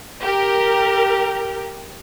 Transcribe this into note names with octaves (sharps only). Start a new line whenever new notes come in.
G4 A#4